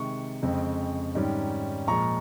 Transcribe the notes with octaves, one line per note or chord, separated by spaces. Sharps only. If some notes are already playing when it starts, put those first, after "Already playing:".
Already playing: C3 D#3 G#3 C#6
F2 C#3 G#3 C4
G#2 D#3 G3 C#4
A#2 F3 G#3 A#5 C#6